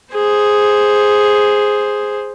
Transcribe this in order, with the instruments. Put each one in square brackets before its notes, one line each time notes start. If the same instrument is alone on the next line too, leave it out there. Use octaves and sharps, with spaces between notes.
[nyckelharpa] G#4 C5